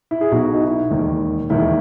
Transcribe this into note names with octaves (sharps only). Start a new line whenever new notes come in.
E4
G#4
B1 B2 F#4
D#4
E4
E1 D#2 D#3
E1 D#2 D#3 E4